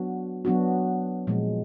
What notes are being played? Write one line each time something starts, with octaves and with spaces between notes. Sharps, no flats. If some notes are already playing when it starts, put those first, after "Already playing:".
Already playing: F#3 B3 D4 F#4
F#3 B3 D4 F#4
A#2 F3 G#3